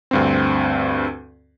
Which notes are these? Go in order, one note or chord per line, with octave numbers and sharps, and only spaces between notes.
D2 G2 C4